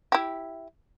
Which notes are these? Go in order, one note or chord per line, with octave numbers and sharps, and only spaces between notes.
E4 G4